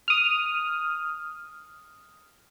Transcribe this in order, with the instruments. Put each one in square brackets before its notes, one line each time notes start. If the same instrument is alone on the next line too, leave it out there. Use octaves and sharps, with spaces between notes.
[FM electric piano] D#6 F6